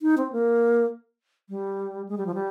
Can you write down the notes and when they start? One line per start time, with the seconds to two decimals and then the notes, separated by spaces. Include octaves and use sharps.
0.02 D#4
0.18 C4
0.32 A#3
1.49 G3
2.09 G#3
2.18 G3
2.26 F3
2.35 G3